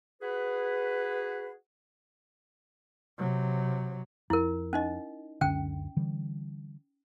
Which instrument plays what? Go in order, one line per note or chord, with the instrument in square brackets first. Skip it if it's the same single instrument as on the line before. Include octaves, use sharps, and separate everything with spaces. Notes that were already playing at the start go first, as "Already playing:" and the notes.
[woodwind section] F#4 G#4 B4
[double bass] C3 F#3
[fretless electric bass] F2 [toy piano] E4 A#4
[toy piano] C#4 D#4 D#5
[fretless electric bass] C#2 F#2 D3 [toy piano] C#4 G5
[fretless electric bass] D3 E3 G3